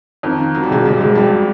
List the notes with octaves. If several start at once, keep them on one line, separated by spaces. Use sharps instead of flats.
F2 D#3 F3
D#3
D#3 F#3
G3
E1 F#2 F#3
E1 G2 G3
E1 G#2 G#3
G2 F#3 G3